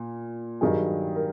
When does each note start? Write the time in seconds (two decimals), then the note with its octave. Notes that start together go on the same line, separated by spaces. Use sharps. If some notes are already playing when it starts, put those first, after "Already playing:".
Already playing: A#2
0.61 G2 D#3 F#3 G#4
1.15 A#4